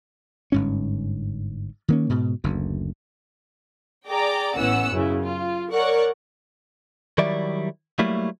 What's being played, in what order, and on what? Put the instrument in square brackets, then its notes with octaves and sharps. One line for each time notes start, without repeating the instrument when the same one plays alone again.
[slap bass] G1 G#2 C#4
D#3 A#3 C#4
G#2 B2
F#1 D2
[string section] G#4 D5 G5 A#5 D6
A1 E3 B3 C#4 F#5 E6
F#2 C#3 E4
F4
A#4 C#5 D5 F#5 C#6 F#6
[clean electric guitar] D#3 F#3 G3 E4 D5 E5
F#3 G3 A3 A#3 E4